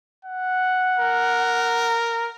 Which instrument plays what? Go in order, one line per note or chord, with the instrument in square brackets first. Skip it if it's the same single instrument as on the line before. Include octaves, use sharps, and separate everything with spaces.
[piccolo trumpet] F#5
[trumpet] A#4